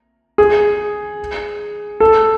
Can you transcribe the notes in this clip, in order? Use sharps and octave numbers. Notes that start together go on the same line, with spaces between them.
G#4
A4